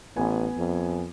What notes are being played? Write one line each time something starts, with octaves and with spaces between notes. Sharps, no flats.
A1 B3 G#5
F2